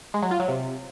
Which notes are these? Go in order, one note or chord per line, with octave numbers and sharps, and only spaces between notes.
G#3
F#3
F4
F#3
C3